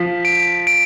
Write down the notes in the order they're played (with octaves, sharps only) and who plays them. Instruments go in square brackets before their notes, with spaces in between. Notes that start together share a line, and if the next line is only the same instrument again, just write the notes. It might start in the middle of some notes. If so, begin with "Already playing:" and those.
Already playing: [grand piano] F3 [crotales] B6
[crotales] D7
D7